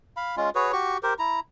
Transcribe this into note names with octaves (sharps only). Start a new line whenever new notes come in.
F5 B5
G#3 C#4 F4
F#4 G#4 B4 C#5
F#4 G4 C#6
G4 A#4 C5
E4 A#5